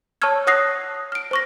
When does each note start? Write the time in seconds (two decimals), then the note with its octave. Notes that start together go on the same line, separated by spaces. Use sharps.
0.22 C#5 A5 C#6 E6 F6 G#6
0.47 C#5 F#5 D#6 F#6 A#6 C7
1.12 F6 D7
1.31 C5 C#6 A#6